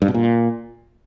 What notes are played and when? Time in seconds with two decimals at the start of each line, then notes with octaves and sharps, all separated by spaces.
0.02 G2
0.08 B2
0.14 A#2